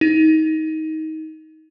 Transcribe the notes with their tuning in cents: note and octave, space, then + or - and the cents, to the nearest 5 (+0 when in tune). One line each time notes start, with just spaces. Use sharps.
D#4 +20